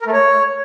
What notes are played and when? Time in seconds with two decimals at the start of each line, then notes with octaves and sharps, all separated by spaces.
0.01 A#4
0.07 A3
0.13 C#5